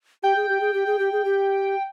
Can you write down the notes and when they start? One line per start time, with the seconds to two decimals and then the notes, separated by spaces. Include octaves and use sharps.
0.23 G4 G5
0.36 G#4
0.49 G4
0.61 G#4
0.74 G4
0.86 G#4
0.99 G4
1.12 G#4
1.25 G4